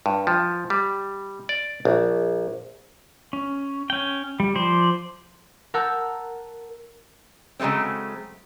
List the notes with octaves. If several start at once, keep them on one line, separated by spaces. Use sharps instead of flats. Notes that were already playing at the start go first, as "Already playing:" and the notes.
G2
F3
G3
D5
A#1
C#4
C#4 G5
G3
F3 C5 D5
A#4 F#5 A5 E6 G6
C#3 F#3 G#3 A3 C4